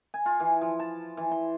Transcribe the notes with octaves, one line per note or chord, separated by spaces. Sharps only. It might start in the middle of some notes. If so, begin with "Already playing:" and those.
G#5
F4
E3
F3
A5
E3
C6